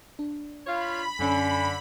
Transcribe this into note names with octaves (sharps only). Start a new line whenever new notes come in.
D4
F4 C#5 F5 B5
F#2 D3 C#4 G#5